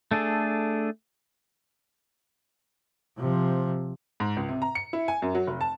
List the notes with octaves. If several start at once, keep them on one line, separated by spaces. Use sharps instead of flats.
A3 D4 G#4 A4
C3 F3
G#2
C#2
C3
A#5
C#7
E4
G#5
F#2
F#3
F1
A5